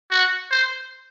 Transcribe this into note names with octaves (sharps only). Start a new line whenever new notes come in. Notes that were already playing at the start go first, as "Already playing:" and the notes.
F#4
C5